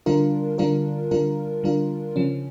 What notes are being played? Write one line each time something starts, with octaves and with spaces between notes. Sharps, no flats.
D3 G3 D4 F4 A#4
D3 G3 D4 F4 A#4
D3 G3 D4 F4 A#4
D3 G3 D4 F4 A#4
C#3 F3 C#4